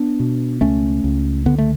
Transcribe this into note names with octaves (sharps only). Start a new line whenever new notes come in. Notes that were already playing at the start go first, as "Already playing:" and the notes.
Already playing: B3 D4
B2
C#2 A3 C#4
C#2
D3 B3
A3